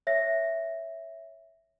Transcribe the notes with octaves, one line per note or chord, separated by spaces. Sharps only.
C#5 E5 A#6